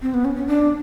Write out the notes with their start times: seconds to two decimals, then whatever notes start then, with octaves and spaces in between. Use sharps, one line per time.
0.02 C4
0.14 B3
0.25 C#4
0.36 C#4
0.47 D4